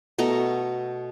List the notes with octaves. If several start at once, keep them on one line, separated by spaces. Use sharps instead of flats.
B2 A3 A4 A#5